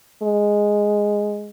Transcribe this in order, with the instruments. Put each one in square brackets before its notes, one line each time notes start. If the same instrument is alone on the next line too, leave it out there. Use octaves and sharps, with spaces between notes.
[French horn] G#3